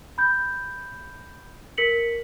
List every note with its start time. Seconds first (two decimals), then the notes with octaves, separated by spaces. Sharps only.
0.18 B5 G6
1.78 A#4 B6 C#7 F#7